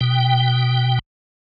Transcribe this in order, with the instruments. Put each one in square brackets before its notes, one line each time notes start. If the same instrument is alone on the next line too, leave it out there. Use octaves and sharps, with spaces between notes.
[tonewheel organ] B2 G5